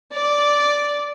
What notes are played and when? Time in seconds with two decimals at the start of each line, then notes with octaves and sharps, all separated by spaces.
0.13 D5